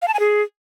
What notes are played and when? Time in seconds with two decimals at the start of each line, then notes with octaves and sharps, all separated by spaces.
0.02 F5
0.08 A5
0.14 G#5
0.20 G#4